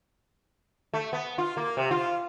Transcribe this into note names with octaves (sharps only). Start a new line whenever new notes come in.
A3
B3
F4
A#3
C3
F4